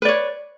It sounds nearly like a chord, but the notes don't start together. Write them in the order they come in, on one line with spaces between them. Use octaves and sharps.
B4 D5 C#5